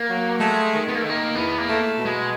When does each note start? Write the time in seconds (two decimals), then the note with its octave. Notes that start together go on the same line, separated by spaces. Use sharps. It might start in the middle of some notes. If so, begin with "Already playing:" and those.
Already playing: A#3
0.08 F#3
0.40 G#3 A3
0.72 D#3
0.88 B3
0.95 A#3
1.02 D#3 A3
1.10 A#3
1.35 E2 B3
1.58 A#3
1.67 A3
1.97 B2
2.05 G#3